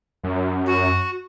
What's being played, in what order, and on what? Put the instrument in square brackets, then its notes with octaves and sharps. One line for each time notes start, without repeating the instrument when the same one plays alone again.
[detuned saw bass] F#2
[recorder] F#4